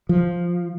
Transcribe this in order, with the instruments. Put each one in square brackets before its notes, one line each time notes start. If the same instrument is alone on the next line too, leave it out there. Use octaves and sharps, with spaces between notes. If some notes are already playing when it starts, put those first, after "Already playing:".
[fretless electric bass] F3